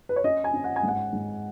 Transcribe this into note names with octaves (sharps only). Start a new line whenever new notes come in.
B4
C#5
C#4 D#5
G#5
C#4
F#5
G#5
G#2
F#5
G#2